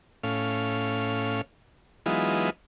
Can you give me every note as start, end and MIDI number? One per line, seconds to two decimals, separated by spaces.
0.24 1.41 45
0.24 1.41 61
0.24 1.41 77
2.06 2.50 52
2.06 2.50 54
2.06 2.50 56
2.06 2.50 59
2.06 2.50 63
2.06 2.50 65